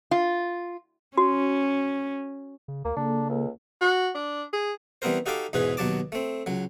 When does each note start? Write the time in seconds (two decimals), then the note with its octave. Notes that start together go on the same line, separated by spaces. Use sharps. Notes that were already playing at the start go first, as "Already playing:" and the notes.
0.11 F4
1.18 C#4 F#4
2.68 C#3
2.85 D2 A#3
2.97 C#3 A#3 D4 A4
3.29 C#2
3.81 F#4
4.15 D4
4.53 G#4
5.02 E3 G3 B3 C4 A#4 C5
5.26 D#4 F#4 G4 A4 F5 D6
5.53 E2 G#2 B2 E3 G#4 B4
5.77 D#2 B2 F#3 A5 D6
6.12 A3 C4
6.46 C#2 F#3